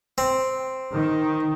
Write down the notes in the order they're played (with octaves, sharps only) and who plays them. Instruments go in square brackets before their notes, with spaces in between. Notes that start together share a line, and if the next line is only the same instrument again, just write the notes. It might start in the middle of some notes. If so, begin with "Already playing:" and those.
[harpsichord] C4
[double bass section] D#3